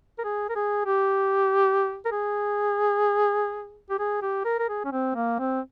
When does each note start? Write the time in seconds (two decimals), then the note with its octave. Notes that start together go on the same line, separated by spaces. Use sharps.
0.19 A#4
0.24 G#4
0.50 A#4
0.56 G#4
0.86 G4
2.05 A#4
2.12 G#4
3.90 G4
3.99 G#4
4.22 G4
4.45 A#4
4.59 A#4
4.69 G#4
4.85 C#4
4.92 C4
5.15 A#3
5.39 C4